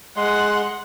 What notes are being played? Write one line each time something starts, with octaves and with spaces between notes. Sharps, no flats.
G#3 F#5 C6